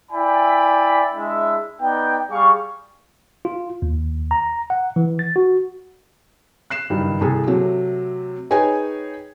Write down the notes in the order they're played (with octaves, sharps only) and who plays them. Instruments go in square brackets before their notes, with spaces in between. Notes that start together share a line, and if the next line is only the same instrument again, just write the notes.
[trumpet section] E4 D5 G5 G#5 B5
G#3 D4 E4 E5
B3 D#4 D5 G5
G3 G#4 F5 C#6
[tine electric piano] F4
D#2
A#5
F#5
E3
A6
F#4
[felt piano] F#6 C7 E7
F#1 G2 D#3
C2 G#4 A4
C3 F#3 A3
D#4 G#4 B4 C#5 G5 G#5